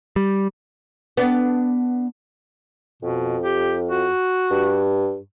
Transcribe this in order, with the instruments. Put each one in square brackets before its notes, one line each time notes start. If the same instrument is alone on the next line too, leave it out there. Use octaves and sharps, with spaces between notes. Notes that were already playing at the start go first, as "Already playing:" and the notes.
[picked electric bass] G3
[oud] B3 D4
[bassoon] F2 [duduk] B2
[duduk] G4
F#4
[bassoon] G2